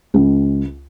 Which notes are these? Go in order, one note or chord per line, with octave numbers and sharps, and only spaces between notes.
C#2